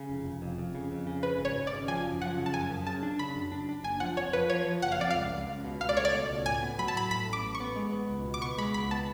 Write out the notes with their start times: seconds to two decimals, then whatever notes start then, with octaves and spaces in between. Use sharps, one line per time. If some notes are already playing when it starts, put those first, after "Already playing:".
Already playing: C#3
0.09 F1
0.25 F1
0.42 F2
0.58 F2
0.75 C#3
0.91 F2
1.07 C#3
1.23 C#3 B4
1.39 G#1
1.45 C#5
1.56 G#1
1.67 D5
1.73 C#3
1.88 F3 G#5
2.05 F#2
2.21 F3 F#5
2.37 C#3
2.46 A5
2.54 F#2 G#5
2.70 F#2
2.86 C#3 A5
3.03 D4
3.19 C#3 B5
3.36 F#2
3.52 D4
3.69 D4
3.84 F#1 G#5
4.00 F3 F#5
4.17 F2 C#5
4.33 F3 B4
4.50 F3 C#5
4.67 F3
4.82 F#1 F#5
4.92 F5
4.99 F2 D5
5.10 C#2 F5
5.31 C#2
5.48 C#2
5.65 B2
5.81 C#2 F5
5.89 D5
5.97 A3 C#5
6.05 D5
6.13 B2
6.30 C#2
6.45 A2 G#5
6.62 B3
6.78 F#3 B5
6.88 A5
6.95 A2 B5
7.11 A2 B5
7.28 A1
7.33 D6
7.44 A1
7.55 C#6
7.60 B3
7.76 G#3
7.92 B3
8.10 C#2
8.25 B2
8.34 D6
8.41 B3 C#6
8.58 G#3 B5
8.74 C#2 B5
8.91 B3 A5